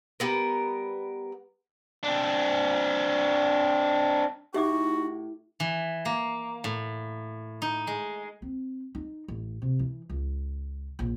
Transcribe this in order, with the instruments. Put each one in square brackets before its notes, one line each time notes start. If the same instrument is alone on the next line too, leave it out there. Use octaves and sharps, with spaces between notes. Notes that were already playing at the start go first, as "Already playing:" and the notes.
[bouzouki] G3 B3 A#4
[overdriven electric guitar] C4 D4
[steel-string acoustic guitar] A2 [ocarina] D#4 [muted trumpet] F#4 [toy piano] G4 E5 D6
[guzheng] E3
A#3
A2
D#4
G#3
[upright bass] C4
D#4
A1
C3
E3
C#2
A#1